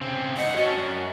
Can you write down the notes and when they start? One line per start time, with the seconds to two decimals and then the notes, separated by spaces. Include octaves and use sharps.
0.01 C#3 C4
0.37 G2 D#5 F#5
0.57 C#4 D4 F#4
0.77 F#2